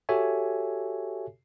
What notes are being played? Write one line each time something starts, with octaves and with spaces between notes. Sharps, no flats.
F#4 G4 A4 C#5 E5 G#5